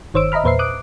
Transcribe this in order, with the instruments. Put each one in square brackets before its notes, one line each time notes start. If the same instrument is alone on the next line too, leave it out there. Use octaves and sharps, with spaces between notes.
[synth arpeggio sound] G1 D#3 C5 C#5 E6 D7
D#5 E5 A#5 B5 F6
E2 A#2 B4 C5 E5 C7
D6 D#6 F#6 D7